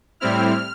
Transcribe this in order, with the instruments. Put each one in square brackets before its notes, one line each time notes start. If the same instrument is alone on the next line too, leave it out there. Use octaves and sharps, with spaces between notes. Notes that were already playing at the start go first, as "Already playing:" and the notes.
[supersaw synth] A2 G3 C4 E4 F6